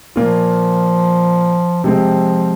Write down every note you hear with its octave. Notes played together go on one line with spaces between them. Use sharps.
A#2 F3 A#3 F4
C3 F3 G#3 C4